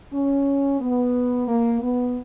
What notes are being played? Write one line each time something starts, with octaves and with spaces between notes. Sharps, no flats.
C#4
B3
A#3
B3